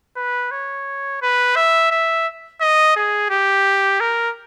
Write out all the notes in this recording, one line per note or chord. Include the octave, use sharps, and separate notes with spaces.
B4
C#5
B4
E5
E5
D#5
G#4
G4
A#4